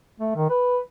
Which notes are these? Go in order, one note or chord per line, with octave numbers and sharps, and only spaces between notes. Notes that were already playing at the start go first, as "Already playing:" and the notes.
A3
D#3
B4